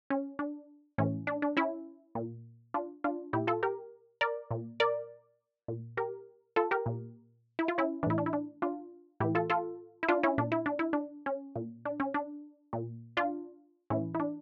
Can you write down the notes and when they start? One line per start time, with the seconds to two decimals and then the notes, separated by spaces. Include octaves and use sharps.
0.10 C#4
0.39 D4
0.98 A2 E3 C#4
1.27 D4
1.42 D4
1.57 C#4 E4
2.15 A#2
2.74 D4 F4
3.04 D4 F4
3.33 A#2 E4 G4
3.47 F4 A4
3.63 G4 A#4
4.21 A#4 D5
4.51 A#2
4.80 A#4 D5
5.68 A#2
5.97 G4 A#4
6.56 F4 A4
6.71 G4 A#4
6.86 A#2
7.59 E4
7.68 F4
7.78 C#4 E4
8.03 E3 D4
8.07 A2 E4
8.18 D4
8.26 E4
8.33 D4
8.62 D4 F4
9.20 A2 E3 E4 G4
9.35 F4 A4
9.50 F4 A4
10.03 E4
10.08 D4 F4
10.23 C#4 E4
10.38 A#2 D4
10.52 E4
10.66 D4
10.79 E4
10.93 D4
11.26 C#4
11.56 A#2
11.85 D4
12.00 C#4
12.14 D4
12.73 A#2
13.17 D4 F4
13.90 A2 E3 C#4 E4
14.15 E4
14.20 D4